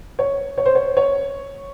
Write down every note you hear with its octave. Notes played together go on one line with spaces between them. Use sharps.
C#5
C#5
C5
C#5
C#5